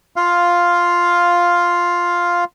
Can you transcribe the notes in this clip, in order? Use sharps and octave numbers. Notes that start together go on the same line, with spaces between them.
F4 F5